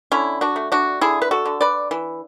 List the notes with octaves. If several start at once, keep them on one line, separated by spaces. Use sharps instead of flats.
D3 C#4 E4
D4 F#4
A3
D4 F#4
D3 E4 G#4
B4
F#4 A4
D3
B4 D5
E3